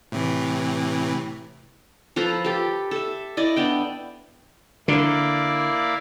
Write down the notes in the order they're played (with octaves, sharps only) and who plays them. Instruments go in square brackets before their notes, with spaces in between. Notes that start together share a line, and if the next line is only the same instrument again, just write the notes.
[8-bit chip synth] A2 C3 E3
[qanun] F3 A4 B4 A#5
G4 A4
A4 E5
E4 D5 D#5
B3 D4 G5
[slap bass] D3 [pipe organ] A#3 E4 D5